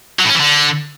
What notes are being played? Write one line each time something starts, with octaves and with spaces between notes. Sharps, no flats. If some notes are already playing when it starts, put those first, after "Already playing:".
F#3
A2
C#4
E3
D3